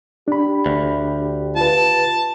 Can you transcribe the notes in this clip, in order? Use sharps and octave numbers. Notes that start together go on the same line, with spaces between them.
D4 G4 B5
D2
F4 B4 A5